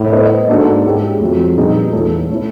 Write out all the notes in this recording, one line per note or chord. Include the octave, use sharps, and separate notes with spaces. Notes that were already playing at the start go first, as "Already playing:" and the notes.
Already playing: A2
B3 E4 A4 C5 D#5
G#2 A#3 D4 F#4 A4
G#3 C#4 E4 G4
F2 F#3 A3 C#4
A#2 G3 B3 D#4 G#4
E2 A3 C#4 F4 A4
A3 C#4 E4